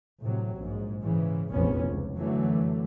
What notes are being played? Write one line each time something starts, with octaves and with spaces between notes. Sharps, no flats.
A2 C3 F#3
A#1 G#2
G#2 C#3 E3
F1 A#1 E2 F3 B3 C#4
C#2
F#2 D3 E3 F#3 A3